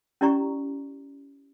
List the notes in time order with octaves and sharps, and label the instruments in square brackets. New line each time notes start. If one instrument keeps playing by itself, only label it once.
[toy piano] C#4 E4 G4 D5 A#5 C#6